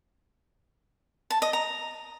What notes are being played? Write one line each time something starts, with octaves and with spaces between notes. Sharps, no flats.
A5
D#5
A#5